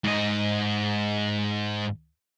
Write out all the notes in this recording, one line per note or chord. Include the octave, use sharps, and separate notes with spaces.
G#2 D#5